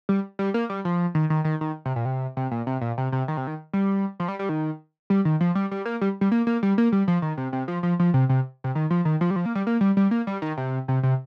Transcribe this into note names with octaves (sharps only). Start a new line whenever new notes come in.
G3
G3
A#3
G3
F3
D#3
D#3
D#3
D#3
C3
A#2
C3
C3
A#2
C3
A#2
C3
C3
D#3
C3
D#3
G3
F3
G3
G3
D#3
G3
D#3
F3
G3
G3
A#3
G3
G3
A#3
A#3
G3
A#3
G3
F3
D#3
C3
C3
F3
F3
F3
C3
C3
C3
D#3
F3
D#3
F3
G3
F3
A#3
G3
A#3
G3
G3
A#3
G3
D#3
C3
C3
C3